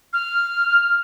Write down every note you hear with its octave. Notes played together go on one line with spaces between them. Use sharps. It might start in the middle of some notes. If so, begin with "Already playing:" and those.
F6